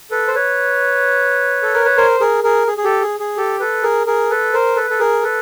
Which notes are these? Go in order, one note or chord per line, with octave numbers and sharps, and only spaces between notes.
A4 B4
C5
B4 C#5
A4
A#4
B4
A#4 C5
G#4 A#4
G#4 A#4
G#4
G#4
G4 A4
G#4
G#4
G4 A4
A4 B4
G#4 A#4
G#4 A#4
A4 B4
A#4 C5
A4 B4
A4
G#4 A#4
A4 B4